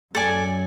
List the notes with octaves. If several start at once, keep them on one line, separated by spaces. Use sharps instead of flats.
F#2 A4 D5 G#5